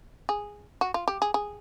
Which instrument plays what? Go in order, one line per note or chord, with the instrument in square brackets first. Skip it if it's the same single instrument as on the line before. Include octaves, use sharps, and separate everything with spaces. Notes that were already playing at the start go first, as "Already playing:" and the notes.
[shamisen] G#4
F#4
F4
G4
G#4
G#4